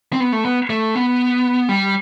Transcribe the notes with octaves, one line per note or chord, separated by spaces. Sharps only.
C4
B3
A3
B3
A3
B3
G3